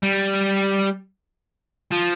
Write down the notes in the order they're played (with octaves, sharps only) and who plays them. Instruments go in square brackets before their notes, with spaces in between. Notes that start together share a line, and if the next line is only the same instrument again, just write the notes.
[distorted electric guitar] G3
F3